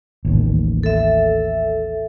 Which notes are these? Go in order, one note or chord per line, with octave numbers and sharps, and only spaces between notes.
A1 D#2
A4 E5